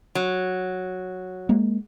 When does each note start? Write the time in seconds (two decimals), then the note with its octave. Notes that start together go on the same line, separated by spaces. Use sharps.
0.15 F#3
1.49 G#3 A#3